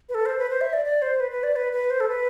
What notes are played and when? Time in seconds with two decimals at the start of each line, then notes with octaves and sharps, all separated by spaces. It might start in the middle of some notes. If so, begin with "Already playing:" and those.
0.09 B4
0.15 A4
0.26 C5
0.38 B4
0.50 C5
0.61 E5
0.73 D5
0.85 D5
1.02 C5
1.20 B4
1.31 B4
1.43 D5
1.56 B4
1.73 B4
1.90 C5
2.00 A4
2.09 B4